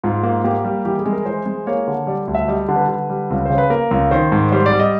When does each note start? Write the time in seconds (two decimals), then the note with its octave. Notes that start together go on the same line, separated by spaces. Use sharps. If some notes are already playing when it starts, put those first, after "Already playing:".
0.03 G#2 F4
0.23 A#3
0.44 A#3 G4
0.65 G3
0.85 E3 G4
0.99 G#4
1.06 G#3
1.12 A#4
1.26 E3 C5
1.46 G#3
1.67 A#3 C#5
1.87 D3
2.07 G3 D5
2.28 D2
2.35 E5
2.48 G3 D#5
2.68 D3
2.76 B4
2.89 D3
3.10 G3
3.30 C#2
3.45 C#3 C5
3.58 B4
3.70 A#3 A#4
3.91 C#2
4.11 D#3 C5
4.32 G#2
4.52 G3 C5
4.66 D5
4.72 G3
4.80 D#5